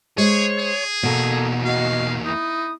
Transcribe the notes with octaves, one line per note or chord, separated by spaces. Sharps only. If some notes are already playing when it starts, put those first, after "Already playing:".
G#3 G#4 C5 C#5
G#4
E2 B2 A#3 A4
F#4 D#5 F5
D#4 E4 D#6